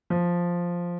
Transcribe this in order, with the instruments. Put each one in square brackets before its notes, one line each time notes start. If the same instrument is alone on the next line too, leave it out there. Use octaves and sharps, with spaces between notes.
[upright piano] F3